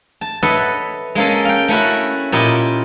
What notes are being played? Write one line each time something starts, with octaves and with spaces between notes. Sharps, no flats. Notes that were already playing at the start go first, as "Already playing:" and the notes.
A5
A4 B4 C#5 D#5 E5 F#5
G#3 A#3 C#4 A4
F5 G5
A3 C#4 E4 F#4
A#2 E4 G4 D#5